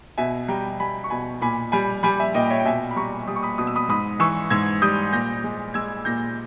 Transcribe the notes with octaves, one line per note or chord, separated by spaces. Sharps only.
B2 E5 G#5
G3 G5 A#5
G3 G#5 B5
C#6
B2 G#5 B5
A#2 G#5 B5
G3 G#5 B5
G3 G#5 B5
E5 G#5
A#2 D#5 G5
C#5 E5
G5
B2 E5 G#5
B5
G3 A#5 C#6
G3 D#6
C#6
B5 D#6
B2 D#6
E6
B5 D#6
G#2 B5 D#6
E3 C#6 E6
G#2 E6 G#6
G3 D#6 G6
A#2 G6 A#6
G#3
G#3 E6 G#6
A#2 G6 A#6